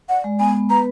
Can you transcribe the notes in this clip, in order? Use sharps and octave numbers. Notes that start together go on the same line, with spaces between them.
D5 F#5
G#3
B3 G#5
B3
B4 A#5